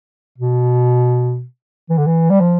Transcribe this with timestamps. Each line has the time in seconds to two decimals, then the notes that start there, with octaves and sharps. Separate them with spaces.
0.38 B2
1.90 E3
1.98 D3
2.06 E3
2.30 G3
2.40 F3